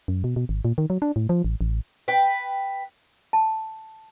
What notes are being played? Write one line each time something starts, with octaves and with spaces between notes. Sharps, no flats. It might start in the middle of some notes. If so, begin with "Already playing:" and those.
F#2
B2
B2
G#1
A#2
D#3
F#3
D4
A2
F3
A1
A1
B4 G5
A5